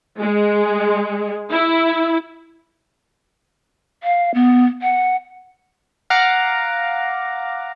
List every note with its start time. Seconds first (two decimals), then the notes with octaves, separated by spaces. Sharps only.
0.19 G#3
1.51 E4
4.03 F5
4.34 B3
4.82 F#5
6.10 F5 F#5 A#5 D6